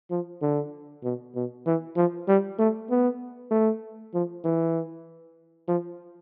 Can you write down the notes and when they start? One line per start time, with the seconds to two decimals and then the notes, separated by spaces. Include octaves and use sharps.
0.10 F3
0.42 D3
1.04 B2
1.35 B2
1.66 E3
1.96 F3
2.28 G3
2.59 A3
2.90 B3
3.51 A3
4.14 F3
4.44 E3
5.68 F3